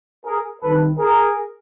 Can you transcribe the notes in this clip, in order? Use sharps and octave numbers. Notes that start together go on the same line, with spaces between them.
G#4 A#4
C2 C3 D#3 A4 B4
G#4 A#4